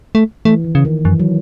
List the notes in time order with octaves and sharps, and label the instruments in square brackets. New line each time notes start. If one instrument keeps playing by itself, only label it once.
[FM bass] A3
[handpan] E3 [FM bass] A3
[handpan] D#3
[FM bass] C#3
[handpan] D#3
[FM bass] F#2 [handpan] E3
[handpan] F#3